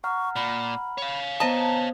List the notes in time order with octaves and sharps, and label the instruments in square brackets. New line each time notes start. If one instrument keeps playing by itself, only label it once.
[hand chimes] F#5 A#5 F6 [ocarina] C#6
[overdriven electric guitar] A#2 [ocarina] B5
[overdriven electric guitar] C#5 F5
[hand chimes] B3 C5 D#6 [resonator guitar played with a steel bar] D#5 A5 [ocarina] A#5